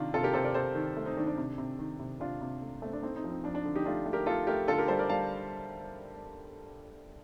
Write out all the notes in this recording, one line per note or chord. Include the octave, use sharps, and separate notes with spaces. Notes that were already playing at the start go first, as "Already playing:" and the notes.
Already playing: C3 D#3 D4 F4
C3 F4 A4
G4 A#4
C3 A4 C5
A#4 D5
C3 A4 C5
D#3
A3
C4 D#4
D#3 D4
D4
C3
C3
D#3
C3
C3 D4 F4
C3
A3
A3 C4
D4
A3 C4 D#4
C4 D#4
F3
C4
F3 D4
D4
D3
D#4 G4
A3 D4 F4
A3
G4 A#4
A3 F4 A4
A3 G4 A#4
D3 F4 A4
G4 A#4
G3 A4 C5
A#4 D5
G3 F5 A5